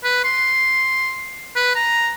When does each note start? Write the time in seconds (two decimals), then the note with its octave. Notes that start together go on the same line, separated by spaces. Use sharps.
0.04 B4
0.24 C6
1.56 B4
1.75 A#5